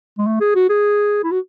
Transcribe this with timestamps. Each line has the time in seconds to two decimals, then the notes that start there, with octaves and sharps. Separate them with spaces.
0.18 G#3
0.27 A3
0.41 G#4
0.55 F#4
0.70 G#4
1.24 E4
1.32 F#4